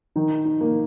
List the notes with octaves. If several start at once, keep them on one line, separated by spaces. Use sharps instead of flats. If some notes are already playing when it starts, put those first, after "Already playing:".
D#3 D#4
D#4
A#3